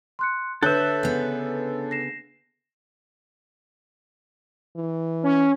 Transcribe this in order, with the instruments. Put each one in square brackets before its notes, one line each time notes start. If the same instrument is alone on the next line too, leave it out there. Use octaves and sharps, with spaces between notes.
[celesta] C6 F#6 C#7
[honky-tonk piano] D3 F#6 G6 [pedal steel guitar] A4 E5 [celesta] B4 C#5
[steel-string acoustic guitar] C#3 B3
[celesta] A#6 C7 E7
[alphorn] E3
[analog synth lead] C#4